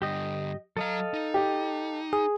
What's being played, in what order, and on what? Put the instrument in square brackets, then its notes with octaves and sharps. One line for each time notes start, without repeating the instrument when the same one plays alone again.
[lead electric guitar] G2 D3 [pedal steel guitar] G4 D#5
[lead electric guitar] F#3 A#5 [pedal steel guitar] A4 D#5 F5
[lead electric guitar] D#4
[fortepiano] G4
[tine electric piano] G#4